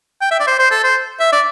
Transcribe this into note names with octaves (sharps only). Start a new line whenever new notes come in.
G5
E5
D5
C5
C5
A4
C5
E5
D5